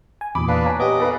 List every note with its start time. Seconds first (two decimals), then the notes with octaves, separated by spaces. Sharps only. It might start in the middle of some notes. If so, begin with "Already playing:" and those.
0.21 G#5
0.35 E2 A#2 B5 D6 D#6
0.48 D4 B4 F5
0.66 C#5 G#5 A#5
0.80 B3 G4 D#5 D6
1.00 A4 B4 F5